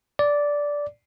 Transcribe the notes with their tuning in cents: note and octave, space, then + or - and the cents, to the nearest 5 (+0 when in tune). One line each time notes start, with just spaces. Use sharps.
D5 -10